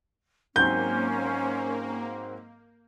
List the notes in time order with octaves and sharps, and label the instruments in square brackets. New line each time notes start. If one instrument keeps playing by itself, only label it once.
[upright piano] G#2 F#3 C4 [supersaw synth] A#3 [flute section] C#4 C5 [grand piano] G6